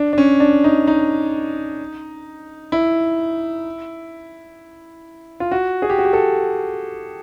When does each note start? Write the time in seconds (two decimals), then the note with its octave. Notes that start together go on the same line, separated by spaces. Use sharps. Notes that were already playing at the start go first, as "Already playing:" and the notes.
Already playing: D4
0.13 D4
0.18 C#4
0.40 D4
0.64 D#4
0.87 D#4
2.72 E4
5.40 F4
5.51 F#4
5.82 G#4
5.90 G4
5.98 F#4
6.05 G4
6.13 A4